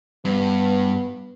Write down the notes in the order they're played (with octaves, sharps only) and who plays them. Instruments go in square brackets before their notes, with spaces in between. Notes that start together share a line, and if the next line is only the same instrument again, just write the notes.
[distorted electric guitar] G2 [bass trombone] B3